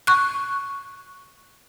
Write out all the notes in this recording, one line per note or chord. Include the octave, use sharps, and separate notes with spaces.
C#6 F#6